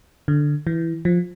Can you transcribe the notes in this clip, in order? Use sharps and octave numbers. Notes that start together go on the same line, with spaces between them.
D3
E3
F3